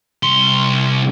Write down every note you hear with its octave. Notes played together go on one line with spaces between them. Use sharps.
C2 C6